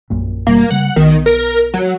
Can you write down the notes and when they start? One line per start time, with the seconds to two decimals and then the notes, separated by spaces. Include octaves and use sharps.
0.10 A#1 F#2 A#2
0.47 F#1 B2 G3 A#3
0.71 C#3 G3 F#5
0.96 B1 D#3 B3
1.26 A#4
1.74 F#3